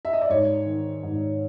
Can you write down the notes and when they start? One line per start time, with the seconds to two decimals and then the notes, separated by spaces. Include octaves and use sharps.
0.05 E5
0.13 D#5
0.21 D5
0.29 G#2 C#5
0.66 D#3
1.03 G#2